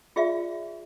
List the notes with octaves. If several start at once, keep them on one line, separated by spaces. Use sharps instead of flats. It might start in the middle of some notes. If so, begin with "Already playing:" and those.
F4 G#4 D5 E5 F5